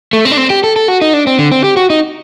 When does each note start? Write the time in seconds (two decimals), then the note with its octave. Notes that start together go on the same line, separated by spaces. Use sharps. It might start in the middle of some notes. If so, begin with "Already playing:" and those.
0.13 A3
0.25 C4
0.31 D4
0.37 C4
0.50 G4
0.64 A4
0.76 A4
0.88 F#4
1.02 D#4
1.14 D4
1.27 C4
1.39 D3
1.52 C4
1.64 G4
1.77 F#4
1.90 D#4